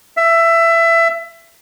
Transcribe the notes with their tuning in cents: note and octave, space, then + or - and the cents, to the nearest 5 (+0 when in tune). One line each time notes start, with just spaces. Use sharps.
E5 +20